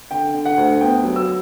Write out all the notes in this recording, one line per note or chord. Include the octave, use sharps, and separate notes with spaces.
D3 G5
D3
F#5
D2
B3 G5
F#3
E6